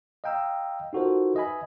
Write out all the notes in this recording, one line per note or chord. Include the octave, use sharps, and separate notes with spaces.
D#5 F5 G5 A#5 E6
D#4 F4 F#4 A4 A#4 C5
B4 D#5 E5 G#5 B5